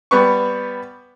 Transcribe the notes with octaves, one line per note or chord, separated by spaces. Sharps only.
G3 B3 B4 C#6